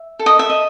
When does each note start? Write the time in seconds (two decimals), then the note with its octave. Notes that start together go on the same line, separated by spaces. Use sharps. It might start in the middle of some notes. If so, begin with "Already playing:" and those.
Already playing: E5
0.19 A4
0.26 D#5
0.39 E5
0.50 D#5